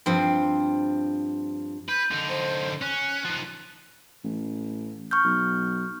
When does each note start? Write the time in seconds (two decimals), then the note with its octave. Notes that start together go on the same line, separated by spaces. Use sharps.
0.06 G2 F3 C4
1.89 B4 G6
2.11 D3 D#4
2.29 C5
2.81 C#4 F#6
3.25 F3 D#4
4.24 A1
5.11 C#6 F6 G6
5.24 B1